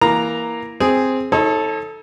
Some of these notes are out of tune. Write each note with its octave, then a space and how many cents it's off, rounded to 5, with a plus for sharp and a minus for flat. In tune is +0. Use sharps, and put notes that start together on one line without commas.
E3 +0 A#3 +10 A#5 +0
C4 +0 G#4 +0
D#4 +30 A4 +0 C#5 -35